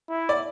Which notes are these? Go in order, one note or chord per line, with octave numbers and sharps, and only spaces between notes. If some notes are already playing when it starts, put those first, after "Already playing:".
E4
D5